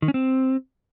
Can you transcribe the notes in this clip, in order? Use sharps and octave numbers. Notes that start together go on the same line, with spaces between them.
D#3
C#4
C4